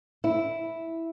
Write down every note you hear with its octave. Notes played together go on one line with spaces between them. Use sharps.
E4